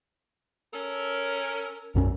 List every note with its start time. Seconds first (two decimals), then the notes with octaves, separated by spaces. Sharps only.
0.74 C#4 A4 A#4
1.95 B1 F#2 C#4